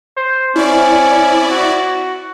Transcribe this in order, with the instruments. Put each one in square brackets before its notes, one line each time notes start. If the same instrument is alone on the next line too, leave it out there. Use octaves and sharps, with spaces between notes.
[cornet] C5
[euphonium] C4 [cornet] C#4 [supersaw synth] E4 D5
[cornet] F#4